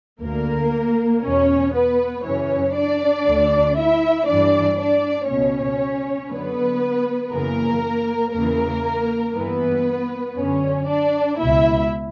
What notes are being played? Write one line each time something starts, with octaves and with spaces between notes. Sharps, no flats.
D2 D3 A#3 A#4
E2 B2 C#4 C#5
B3 B4
F#2 C#3 E3 C#4 C#5
D4 D5
D2 D3
E4 E5
G2 E3 D4 D5
D4 D5
C#2 B2 C#4 C#5
F#2 D3 B3 B4
F#2 C#3 E3 A#3 A#4
E2 C#3 E3 A#3 A#4
G2 E3 B3 B4
F#2 D3 C#4 C#5
D4 D5
C#2 B2 E4 E5